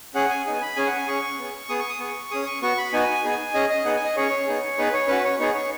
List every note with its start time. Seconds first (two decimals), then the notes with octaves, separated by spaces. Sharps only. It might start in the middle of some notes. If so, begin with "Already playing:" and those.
0.15 C#4 G#4 F#5
0.30 G#5
0.46 B3 D#4 G#4 G#5
0.62 B5
0.76 C#4 G#4 G#5
0.87 F#5
0.97 G#5
1.07 C#4 G#4 C#6
1.39 B3 G#4
1.69 B3 G#4 D#6
1.79 C#6
1.89 D#6
2.00 B3 G#4 C#6
2.31 C#4 G#4 D#6
2.46 C#6
2.62 B3 F#4 C#6
2.78 B5
2.92 B3 D#4 F#4 G#5
3.24 B3 D#4 G#4
3.54 C#4 G#4 D#5
3.70 D#5
3.85 B3 D#4 G#4 F#5
3.96 G#5
4.05 D#5
4.16 C#4 G#4 C#5
4.47 B3 D#4 G#4
4.78 B3 D#4 G#4 B4
4.93 C#5
5.08 C#4 F#4 B4
5.24 C#5
5.40 B3 D#4 G#4 C#5
5.54 C#5